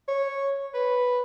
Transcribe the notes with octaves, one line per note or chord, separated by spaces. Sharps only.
C#5
B4